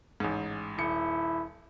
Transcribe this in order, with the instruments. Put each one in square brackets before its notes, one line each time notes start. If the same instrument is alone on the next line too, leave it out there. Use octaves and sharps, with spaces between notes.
[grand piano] A1 G#2
[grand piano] D#1 C#7 [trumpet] E4